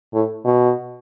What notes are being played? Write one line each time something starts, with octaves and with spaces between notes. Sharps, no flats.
A2
B2